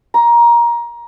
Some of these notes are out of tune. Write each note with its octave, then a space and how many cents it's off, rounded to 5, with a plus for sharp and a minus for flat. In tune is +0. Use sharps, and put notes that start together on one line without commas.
A#5 +20